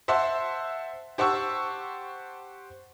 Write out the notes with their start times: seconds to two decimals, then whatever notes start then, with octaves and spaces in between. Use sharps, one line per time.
0.08 C5 E5 F#5 A5 C6
1.18 G4 C5 F#5 A5 C#6 E6